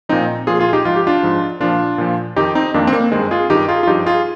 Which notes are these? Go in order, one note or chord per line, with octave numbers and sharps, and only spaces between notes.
A#2 F3 C4 D#4
A#2 F3 F4 G#4
F4 G#4
D#4 G4
G#2 F3 F4
G4
D4 F4
G#2 F3
A#2 F3 D4 F4
A#2 F3
F2 D#3 D#4 G4
C4 D#4
F2 D#3 A#3 D4
C4
A#3
G2 D#3 G#3 C4
F4 G#4
G2 D#3 D#4 G4
F4 G#4
F4
G2 F3 D#4 G4
F4 G#4